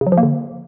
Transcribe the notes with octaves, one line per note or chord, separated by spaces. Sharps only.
C#3
F#3
F3
A#3
D3